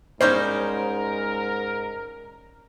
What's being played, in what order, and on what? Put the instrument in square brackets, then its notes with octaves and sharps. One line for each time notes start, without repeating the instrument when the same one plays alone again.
[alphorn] G#2 [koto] G3 C#4 D#4 [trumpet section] A#4 [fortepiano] C5